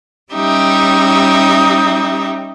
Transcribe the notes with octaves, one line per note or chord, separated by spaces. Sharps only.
G3 C#4 D#4 G4 E5